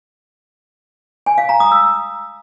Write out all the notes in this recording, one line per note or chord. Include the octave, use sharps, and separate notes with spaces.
G#5
F5
A#5
D#6
E6